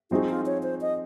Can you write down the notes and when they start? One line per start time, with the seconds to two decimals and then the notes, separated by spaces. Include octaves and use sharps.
0.11 F3 C4 D#4 F#4 G#4
0.29 F4
0.46 C#5
0.63 C5
0.81 D#5